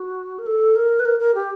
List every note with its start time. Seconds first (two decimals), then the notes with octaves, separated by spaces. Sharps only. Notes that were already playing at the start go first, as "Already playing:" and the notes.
Already playing: F#4
0.39 A#4
0.46 A4
0.76 A#4
1.00 B4
1.05 A#4
1.20 A#4
1.35 G4